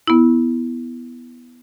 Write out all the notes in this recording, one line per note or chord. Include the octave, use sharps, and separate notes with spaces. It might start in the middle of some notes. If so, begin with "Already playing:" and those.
B3 E4